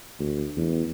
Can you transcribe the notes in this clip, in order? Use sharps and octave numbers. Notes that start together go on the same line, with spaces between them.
D2
E2